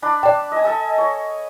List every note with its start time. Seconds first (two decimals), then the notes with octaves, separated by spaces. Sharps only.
0.02 D4 D5 B5
0.23 D5 G5 A5
0.52 D#5 G#5
0.64 A4 D#5 G#5
0.98 C#5